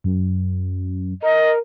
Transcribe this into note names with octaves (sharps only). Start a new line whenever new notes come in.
F#2
A#4 D#5